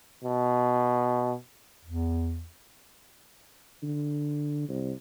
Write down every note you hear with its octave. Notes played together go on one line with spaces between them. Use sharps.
B2
E2
D3
C2